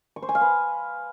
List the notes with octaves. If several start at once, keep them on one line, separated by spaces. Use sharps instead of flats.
C#6
C5
G#5
F5
B4